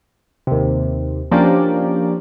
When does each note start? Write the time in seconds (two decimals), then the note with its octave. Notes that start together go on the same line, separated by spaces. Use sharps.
0.47 D#2 C3
1.31 F3 A#3 C#4 D4 G4 D5